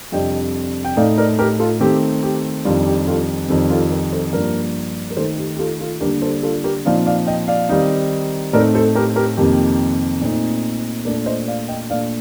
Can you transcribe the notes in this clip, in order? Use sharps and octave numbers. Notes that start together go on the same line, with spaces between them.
F2 C3 G3 D4 D#5 G5
G5
A2 A3 D#4 D5 F5
A#4 D5
G4 A#4
F4 A4
D#3 A3 C4 G4
G4
F2 D#3 G3 D4 F4
G4
F4 A4
F2 D#3 G3 C4
F4 A4
G4 A#4
A4 C5
G2 F3 A#3 D4 A#4 D5
A#4
D#3 A3 D#4 A4 C5
G4
G4
F4 A4
F4 A4
D3 G3 A#3 D4 G4 A#4
A4 C5
F4 A4
G4 A#4
A#2 F3 C4 D#4 D5 F5
D5 F5
D#5 G5
D5 F5
D#3 G3 C4 D#4
A2 A3 C4 D#4 A#4 D5
A4 C5
G4 A#4
G4 A#4
F2 C3 D#3 A#3 G4
A#2 A3 C4 D#4
A#2 A3 D4 A#4 D5
C5 D#5
D5 F5
D#5 G5
A#2 A3 D4 D5 F5